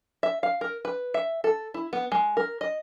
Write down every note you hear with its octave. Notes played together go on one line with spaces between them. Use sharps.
E5
F5
A#4
B4
E5
A4
E4
B3
G#3
A#4
D#5